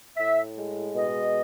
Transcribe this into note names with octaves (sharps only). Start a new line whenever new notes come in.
A2 E5
G#3
B2 D#5